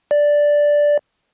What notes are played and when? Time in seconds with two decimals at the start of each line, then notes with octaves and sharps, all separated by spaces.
0.11 D5